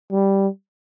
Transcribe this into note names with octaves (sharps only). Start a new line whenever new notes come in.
G3